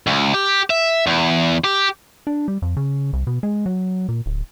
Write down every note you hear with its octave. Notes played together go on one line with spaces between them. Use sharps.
C#2
G4
E5
E2
G4
D4
G3
F2
C#3
C2
B2
G#3
F#3
A#2
D1